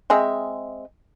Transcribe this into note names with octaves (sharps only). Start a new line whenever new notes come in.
G#3 C4 G#4 E5